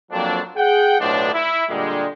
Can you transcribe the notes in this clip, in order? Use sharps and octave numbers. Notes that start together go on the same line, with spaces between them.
F2 F3 F#3 A#3 C4 D4
G#4 F#5 G5
B1 A2 F3 D4
E4
A#2 D3 G3 G#3